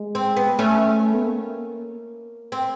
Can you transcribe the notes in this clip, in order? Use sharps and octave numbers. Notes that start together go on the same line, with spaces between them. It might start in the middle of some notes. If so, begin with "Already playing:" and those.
Already playing: G#3
C4
B3
A3 C#4
B3
A#3
C4